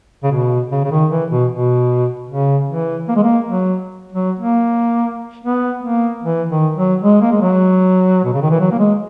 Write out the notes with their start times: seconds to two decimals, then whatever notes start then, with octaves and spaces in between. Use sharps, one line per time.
0.23 C#3
0.32 B2
0.72 C#3
0.84 C#3
0.91 D#3
1.11 E3
1.31 B2
1.50 B2
2.29 C#3
2.69 E3
3.09 A#3
3.16 G#3
3.23 A#3
3.48 F#3
4.13 F#3
4.39 A#3
5.45 B3
5.84 A#3
6.24 E3
6.49 D#3
6.76 F#3
7.02 G#3
7.22 A#3
7.32 G#3
7.42 F#3
8.24 B2
8.34 C#3
8.42 D#3
8.51 E3
8.60 F#3
8.72 A#3
8.79 G#3